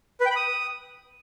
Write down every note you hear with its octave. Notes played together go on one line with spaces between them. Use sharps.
B4
G5
B5
D#6